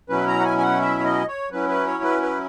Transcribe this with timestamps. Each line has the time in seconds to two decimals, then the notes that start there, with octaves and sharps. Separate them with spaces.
0.09 B2 F#3 C#4 E4 B4
0.28 A#5
0.40 F#5
0.45 G#5
0.58 G#5
0.62 F#5
0.81 E5
0.99 C#5
1.04 D#5
1.28 C#5
1.51 F#3 C#4 E4 B4
1.69 B4
1.86 C#5
2.04 B4
2.22 B4